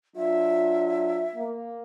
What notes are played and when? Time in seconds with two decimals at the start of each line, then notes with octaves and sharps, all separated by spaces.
0.16 F#3 D4 F4 E5
1.35 A#3